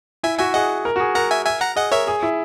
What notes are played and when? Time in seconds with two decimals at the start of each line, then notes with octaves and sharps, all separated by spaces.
0.23 E4 E5 G#5
0.39 F#4 E5 G#5
0.54 G#4 D#5 F#5
0.85 A#4
0.96 F#4
1.00 G#4
1.15 A#4 F#5 A#5
1.31 E5 G#5
1.46 E5 G#5
1.61 F#5 A#5
1.76 G#4 D#5 F#5
1.92 A#4 C#5 E5
2.07 G#4
2.23 E4